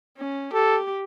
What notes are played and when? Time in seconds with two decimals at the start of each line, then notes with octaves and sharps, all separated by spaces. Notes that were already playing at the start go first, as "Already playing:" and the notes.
0.18 C#4
0.54 G4 A4